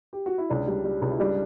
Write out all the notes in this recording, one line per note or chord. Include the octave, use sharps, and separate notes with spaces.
G4
F#4
E4
C#2 D4
G3
G3
C#2
E4
G3 D4